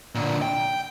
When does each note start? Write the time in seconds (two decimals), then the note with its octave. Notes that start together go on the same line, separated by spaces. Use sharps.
0.15 A#2 D3
0.42 G5